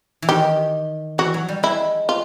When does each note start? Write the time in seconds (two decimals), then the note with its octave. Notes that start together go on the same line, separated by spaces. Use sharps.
0.22 E3
0.29 D#3 G4
1.18 E3 F#4
1.34 F#3
1.48 G3
1.63 G#3 E4
2.09 F4